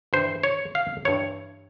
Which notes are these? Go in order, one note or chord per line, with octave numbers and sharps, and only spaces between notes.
G2 E3 C5
C#5
F5
G2 E3 C#5